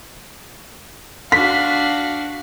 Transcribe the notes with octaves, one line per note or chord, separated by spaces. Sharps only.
D4 F#4 F5 B6